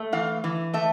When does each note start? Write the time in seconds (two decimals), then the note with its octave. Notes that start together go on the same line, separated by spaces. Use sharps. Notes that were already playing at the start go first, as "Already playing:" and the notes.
Already playing: A3
0.12 E3 F5
0.44 E3
0.73 A3 E5